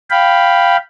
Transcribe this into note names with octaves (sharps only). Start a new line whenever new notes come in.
F5 G5 B5